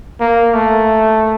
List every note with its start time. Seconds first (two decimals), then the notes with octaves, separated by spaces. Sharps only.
0.20 A#3
0.54 A3